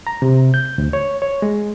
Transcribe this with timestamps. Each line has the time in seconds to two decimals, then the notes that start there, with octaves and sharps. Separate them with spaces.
0.07 A#5
0.22 C3
0.54 G6
0.78 D2
0.93 C#5
1.22 C#5
1.42 G#3